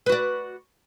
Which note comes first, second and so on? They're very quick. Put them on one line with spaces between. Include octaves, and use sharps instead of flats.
B4 F#4 D5